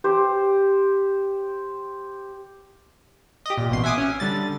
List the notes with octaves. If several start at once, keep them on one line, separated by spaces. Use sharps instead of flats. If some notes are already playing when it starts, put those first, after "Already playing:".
G4 C5
G4 D#5
A#2
A1 B2 C6
E5 F#5 G#5 D6 D#6
C#4
D3 G3 A6